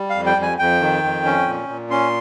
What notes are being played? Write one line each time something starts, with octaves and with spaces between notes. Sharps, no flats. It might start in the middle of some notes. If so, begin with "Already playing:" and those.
Already playing: G3
F5
F2
G5
F2
G#5
F2 G5
D#3
F2
C#4
A#2
A#2
C#4 C6